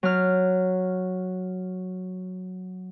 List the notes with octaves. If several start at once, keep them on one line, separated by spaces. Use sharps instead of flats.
F#3 F6